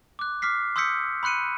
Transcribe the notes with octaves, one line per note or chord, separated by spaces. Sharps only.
D6 F#6
D6 F6 B6 C7
C6 D#6 E6 G6 B6 C#7
B5 C6 F#6 C#7 D#7